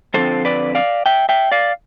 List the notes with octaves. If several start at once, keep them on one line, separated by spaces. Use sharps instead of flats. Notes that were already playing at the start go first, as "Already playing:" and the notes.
F2 D3 F3 C4 A4 C5
B4 D5
D5 F5
E5 G5
E5 G5
D5 F5